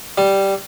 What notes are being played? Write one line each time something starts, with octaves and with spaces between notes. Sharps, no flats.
G3